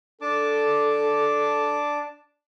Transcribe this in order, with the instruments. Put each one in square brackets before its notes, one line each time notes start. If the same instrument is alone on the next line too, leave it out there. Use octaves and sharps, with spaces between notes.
[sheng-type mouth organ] D4 A5 D6 [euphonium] A4